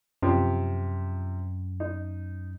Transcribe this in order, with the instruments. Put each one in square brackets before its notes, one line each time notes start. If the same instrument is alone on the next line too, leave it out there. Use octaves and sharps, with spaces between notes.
[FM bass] F#2 [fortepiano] C3 F3
[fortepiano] D#4